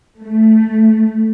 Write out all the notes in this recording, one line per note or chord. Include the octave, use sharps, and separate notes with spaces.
A3